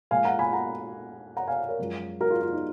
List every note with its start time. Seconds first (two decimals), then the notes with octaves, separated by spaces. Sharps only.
0.11 A#2 F3 G#3 F5 G#5
0.25 F#5 A#5
0.39 G#5 B5
0.53 F#5 A#5
1.37 F#5 A#5
1.47 F5 G#5
1.69 A#4 C#5
1.79 F#2 F3 G#3
2.20 F#4 A#4
2.30 F4 G#4
2.42 F4
2.52 D#4